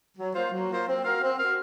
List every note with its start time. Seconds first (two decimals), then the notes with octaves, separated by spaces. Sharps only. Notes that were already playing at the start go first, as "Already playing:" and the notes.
0.18 F#3
0.35 A#3 F4 C5
0.51 F#3
0.69 A#3 F4 C5
0.87 C4
1.04 F#4 A#4 F5
1.22 C4
1.38 F#4 A#4 F5